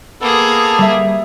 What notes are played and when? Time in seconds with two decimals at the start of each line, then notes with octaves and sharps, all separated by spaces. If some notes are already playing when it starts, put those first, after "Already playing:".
0.21 A#3 B3 G#4 A4 A5
0.78 G3 E5